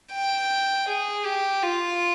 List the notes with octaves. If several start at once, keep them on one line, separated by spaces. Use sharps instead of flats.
G5
G#4
G4
F4